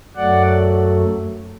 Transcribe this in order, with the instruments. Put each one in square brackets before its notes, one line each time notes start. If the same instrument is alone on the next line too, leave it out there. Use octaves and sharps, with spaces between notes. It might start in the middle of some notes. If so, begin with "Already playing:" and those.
[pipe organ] F#2 F#3 A3 D5 F#5